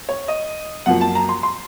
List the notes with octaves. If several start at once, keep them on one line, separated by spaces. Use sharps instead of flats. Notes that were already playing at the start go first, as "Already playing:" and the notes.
C#5
D#5
F#2 F3 A#3 F#5
A5
A#5
C6
C6